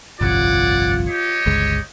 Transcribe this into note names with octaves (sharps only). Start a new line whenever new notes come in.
G1 C2 F2 F4 C#5 D5 F#5
G4 C#5 D#5
G1 C#2 G#3